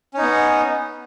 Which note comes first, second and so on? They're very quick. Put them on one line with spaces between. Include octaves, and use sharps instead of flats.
C#4 D#4 B3